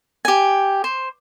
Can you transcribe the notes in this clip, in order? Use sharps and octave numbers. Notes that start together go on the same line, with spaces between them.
G4 G#5
C5